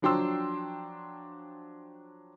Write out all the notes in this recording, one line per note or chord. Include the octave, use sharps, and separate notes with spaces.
F3 F#3 D4 G5 C6 E6